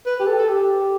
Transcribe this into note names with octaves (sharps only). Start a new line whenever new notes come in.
B4
G4
A4
A4
G4